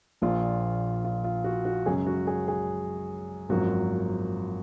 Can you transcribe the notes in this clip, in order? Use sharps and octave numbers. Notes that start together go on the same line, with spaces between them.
A#1 A#2 F3 F4
F4
F4
F#4
F#4
F#2 C#3 G#3 C#4 G#4
F#4
G#4
G#4
G#1 F#2 F3 A#3 F#4